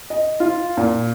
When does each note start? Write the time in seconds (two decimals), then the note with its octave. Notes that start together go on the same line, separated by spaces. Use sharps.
0.10 D#5
0.40 F4
0.77 A#2